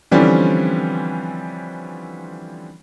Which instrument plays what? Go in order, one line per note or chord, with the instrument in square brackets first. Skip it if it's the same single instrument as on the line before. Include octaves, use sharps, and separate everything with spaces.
[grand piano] D3 E3 F3 G3 C4 C#4